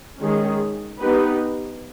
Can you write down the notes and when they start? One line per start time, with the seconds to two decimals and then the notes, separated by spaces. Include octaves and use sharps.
0.19 D#3 G#3 C#4 G#4
0.99 B3 D#4 G4 B4